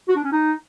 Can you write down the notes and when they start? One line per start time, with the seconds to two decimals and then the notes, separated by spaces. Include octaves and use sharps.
0.08 F#4
0.16 D4
0.24 C#4
0.32 D#4